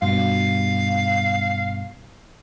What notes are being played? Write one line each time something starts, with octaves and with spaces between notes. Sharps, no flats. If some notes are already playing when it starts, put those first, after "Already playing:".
G2 B2 F5